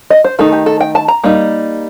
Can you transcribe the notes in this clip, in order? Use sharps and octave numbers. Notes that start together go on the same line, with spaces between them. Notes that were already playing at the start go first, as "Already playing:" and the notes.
D#5
C5
D#3 A3 D#4 A4
G4
A4
G5
A5
A#5
G3 A#3 D#4